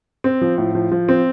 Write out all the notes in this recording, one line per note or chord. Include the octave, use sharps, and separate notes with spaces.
C4
F3
A2
F3
F3
C4